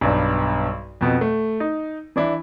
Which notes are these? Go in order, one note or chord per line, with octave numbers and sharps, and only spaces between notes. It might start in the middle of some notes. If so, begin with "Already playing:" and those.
B1 G2 G3
F2 B2
A3
D#4
E3 D4 E4